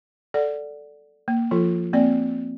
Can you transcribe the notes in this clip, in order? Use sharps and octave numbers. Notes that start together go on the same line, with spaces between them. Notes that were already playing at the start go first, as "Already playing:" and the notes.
A4 D5 F#5
A#3
F3 F4 A4
A#3 C4 D5